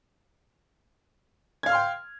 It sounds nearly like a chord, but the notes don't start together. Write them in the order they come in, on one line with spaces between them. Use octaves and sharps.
G#6 F5 F6 C6 G5